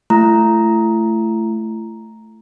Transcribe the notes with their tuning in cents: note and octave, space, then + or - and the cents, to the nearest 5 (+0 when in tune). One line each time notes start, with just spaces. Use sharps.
A3 +0 E4 +40 A#5 +0